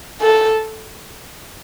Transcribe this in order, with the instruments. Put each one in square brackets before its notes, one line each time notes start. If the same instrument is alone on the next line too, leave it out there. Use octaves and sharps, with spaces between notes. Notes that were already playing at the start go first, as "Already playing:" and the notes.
[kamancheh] A4